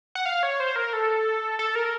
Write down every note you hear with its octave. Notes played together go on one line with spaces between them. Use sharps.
F#5
F5
C#5
C5
A#4
A4
A4
A#4